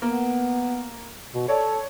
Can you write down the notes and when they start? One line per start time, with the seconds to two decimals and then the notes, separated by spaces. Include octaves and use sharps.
0.02 A#3 B3
1.34 B2
1.48 A4 C#5 D5